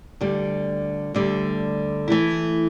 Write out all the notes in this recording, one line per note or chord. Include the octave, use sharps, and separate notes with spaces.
D2 D3 G3
D2 D3 G3
E3 A3 E4